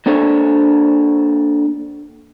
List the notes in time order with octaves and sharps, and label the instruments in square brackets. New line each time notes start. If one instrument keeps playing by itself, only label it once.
[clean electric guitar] A#3 D4 A4 C5 C#5